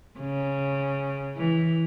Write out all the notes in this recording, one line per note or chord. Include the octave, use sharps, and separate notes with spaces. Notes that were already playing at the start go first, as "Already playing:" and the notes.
C#3
E3